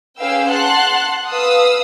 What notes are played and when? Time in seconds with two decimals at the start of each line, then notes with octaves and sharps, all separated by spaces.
0.18 C#4 G#4 B4 F5 G5 E6
0.51 F#5 A5 C6 F#6
1.30 B4 F5 D#6 E6